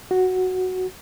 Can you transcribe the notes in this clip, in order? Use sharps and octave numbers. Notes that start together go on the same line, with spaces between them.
F#4